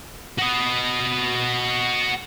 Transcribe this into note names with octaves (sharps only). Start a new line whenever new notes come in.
F#4 D#5